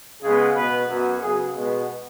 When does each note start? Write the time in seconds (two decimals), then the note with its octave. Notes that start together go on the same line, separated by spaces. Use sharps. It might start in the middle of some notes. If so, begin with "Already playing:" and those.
0.22 C#3 G#3 B3 G#4
0.55 B2 B3 B4
0.88 F#2 F#3 B3
1.21 C#3 F#3 B3 G#4
1.55 B2 G#3 B3